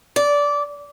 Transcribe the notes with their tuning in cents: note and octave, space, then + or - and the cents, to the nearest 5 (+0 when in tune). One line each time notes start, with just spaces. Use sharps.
D5 -15